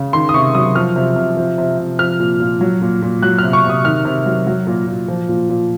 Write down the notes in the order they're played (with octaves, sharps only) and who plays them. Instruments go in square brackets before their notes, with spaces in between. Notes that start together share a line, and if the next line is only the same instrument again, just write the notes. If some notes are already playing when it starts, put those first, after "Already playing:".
Already playing: [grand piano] C#3
D#3 C6
D#6
C3 C#6
F#3 D#6
F3 F6
C3
C3
F3
C3
C3
F3 F6
A#2
A#2
F#3
A#2
A#2
F#3 F#6
C3 F6
C#6
C3
D#6
D#3 F6
C3
F#3
F#3
A#2
A#2
F3
A#2
A#2